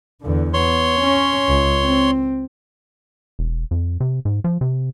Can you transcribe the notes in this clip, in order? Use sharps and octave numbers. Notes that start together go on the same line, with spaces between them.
E2 D3
B3 C#5 C6
C#4
C#2
C4
E1
F2
C3
G#2
F3
C3